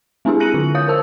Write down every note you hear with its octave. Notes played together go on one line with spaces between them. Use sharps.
G#3 C4 D4 E4 G4 G#4
F#6 A#6 C#7 D#7 F#7
D3 F4
C#5 F5 D#6 G6
A#4 C5 A5 E6